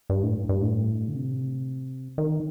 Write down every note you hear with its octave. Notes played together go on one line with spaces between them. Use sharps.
G2
A2
G2
G2
A2
D3
C3
D#3